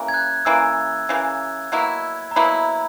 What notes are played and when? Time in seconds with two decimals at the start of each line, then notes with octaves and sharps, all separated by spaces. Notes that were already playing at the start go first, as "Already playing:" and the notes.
Already playing: C#3 E3 A#3
0.08 G#6
0.14 F#6
0.45 C#3 E3 A#3 E6
1.09 C#3 E3 A#3
1.72 B2 F#3 A#3 E4
2.31 A#5
2.36 B2 F#3 A#3 E4 B5